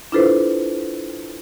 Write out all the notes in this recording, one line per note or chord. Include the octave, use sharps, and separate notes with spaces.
D4 E4 F4 A4 B4 C5